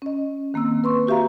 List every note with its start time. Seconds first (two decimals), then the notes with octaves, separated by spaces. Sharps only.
0.02 C#4 D#5
0.54 D#3 A#3 C4 E6
0.84 B4 C6 C#6
1.07 F#4 G4 E5 F5 A#5